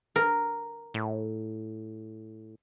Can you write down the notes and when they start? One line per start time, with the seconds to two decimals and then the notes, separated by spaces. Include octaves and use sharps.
0.16 A#4
0.94 A2